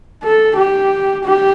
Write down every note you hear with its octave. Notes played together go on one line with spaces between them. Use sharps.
A4
G4
G4